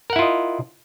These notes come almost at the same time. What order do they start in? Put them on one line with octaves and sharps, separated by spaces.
A#4 F#5 E4 F4 D#5